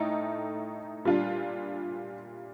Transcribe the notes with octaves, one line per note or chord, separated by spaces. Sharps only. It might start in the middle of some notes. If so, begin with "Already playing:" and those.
Already playing: A2 A3 D#4 G5
A#2 G3 D4 F4